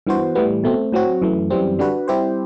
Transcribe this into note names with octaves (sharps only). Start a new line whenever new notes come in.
G2 E3 B3 F#4 C5
A2 E3 G3 B3
B2 A3 C4
A2 F#3 C4 F#4
F#2 E3 A3
F#2 E3 G3 C4
D3 G3 D4 F#4 B4
G3 C4 E4 G4 C5